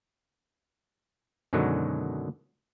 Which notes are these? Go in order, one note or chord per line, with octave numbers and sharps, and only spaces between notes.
F#2 B2 D3 D#3 F#3 G#3